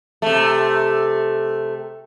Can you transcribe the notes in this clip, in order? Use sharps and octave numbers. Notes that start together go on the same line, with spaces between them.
C3 A3